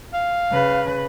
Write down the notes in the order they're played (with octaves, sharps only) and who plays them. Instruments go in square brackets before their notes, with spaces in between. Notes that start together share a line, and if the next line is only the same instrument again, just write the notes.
[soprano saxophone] F5
[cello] C#3 B4